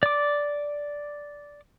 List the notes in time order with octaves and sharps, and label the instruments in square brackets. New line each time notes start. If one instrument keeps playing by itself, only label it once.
[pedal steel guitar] D5 D6